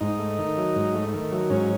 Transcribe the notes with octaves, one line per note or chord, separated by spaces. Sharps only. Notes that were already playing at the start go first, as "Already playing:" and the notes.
G#2 D#4
A3
D#3
F#3
G#2
A3
D#3
F#3
G#2 C#4